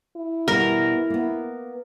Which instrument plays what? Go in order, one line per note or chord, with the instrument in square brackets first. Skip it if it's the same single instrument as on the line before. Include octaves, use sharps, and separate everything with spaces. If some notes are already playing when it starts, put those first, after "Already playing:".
[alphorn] E4
[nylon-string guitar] B2 E3 G3 [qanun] A#4
[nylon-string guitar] A#3 B3